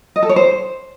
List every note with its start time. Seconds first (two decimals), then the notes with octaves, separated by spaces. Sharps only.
0.16 D#5
0.23 A4
0.29 C#5
0.36 C5